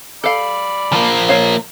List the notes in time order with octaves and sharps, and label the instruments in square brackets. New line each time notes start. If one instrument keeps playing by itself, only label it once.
[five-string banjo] A4 F5 [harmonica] D5 B5 D6
[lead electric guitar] F3 A#3
[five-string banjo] F4 C#5 F5